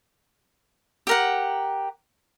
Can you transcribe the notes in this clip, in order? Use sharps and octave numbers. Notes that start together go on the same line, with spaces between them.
G4 A#4 F#5